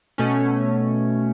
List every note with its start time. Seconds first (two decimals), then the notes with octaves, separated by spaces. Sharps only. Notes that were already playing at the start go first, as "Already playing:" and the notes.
0.18 B2 A3 C#4